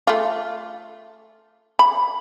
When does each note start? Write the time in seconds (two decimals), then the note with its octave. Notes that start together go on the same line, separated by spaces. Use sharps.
0.07 A3 F4
1.79 B5